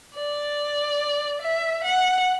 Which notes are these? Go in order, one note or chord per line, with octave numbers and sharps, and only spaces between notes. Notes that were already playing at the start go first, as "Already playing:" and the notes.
D5
E5
F#5